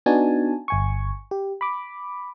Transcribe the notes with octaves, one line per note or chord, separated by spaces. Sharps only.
B3 D4 D#4 F#4 G#5 A5
G1 G#5 C#6
G4
B5 D6